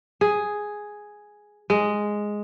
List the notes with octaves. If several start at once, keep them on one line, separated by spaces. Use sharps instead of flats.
G#4
G#3